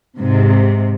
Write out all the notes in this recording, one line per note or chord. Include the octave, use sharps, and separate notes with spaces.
G#2 C3